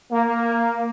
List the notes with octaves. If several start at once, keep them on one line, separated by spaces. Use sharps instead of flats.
A#3